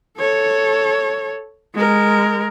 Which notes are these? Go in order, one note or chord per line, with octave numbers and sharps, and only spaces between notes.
A4 C#5
G#3 A#4